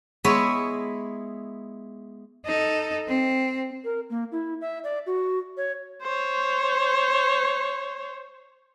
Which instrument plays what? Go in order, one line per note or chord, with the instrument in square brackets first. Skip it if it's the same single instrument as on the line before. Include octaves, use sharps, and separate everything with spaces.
[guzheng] G#3 B3 E4 C#5 E5
[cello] D#4 A4
C4
[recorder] A#4
A#3
E4
E5
D5
F#4
C#5
[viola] C5 C#5